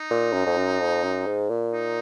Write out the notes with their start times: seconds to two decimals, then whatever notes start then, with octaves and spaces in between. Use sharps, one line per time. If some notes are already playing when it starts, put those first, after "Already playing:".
Already playing: D#4
0.10 A#2
0.33 F#2
0.46 F2
0.57 F#2
0.81 F2
1.03 F#2
1.27 G#2
1.50 A#2
1.73 D#4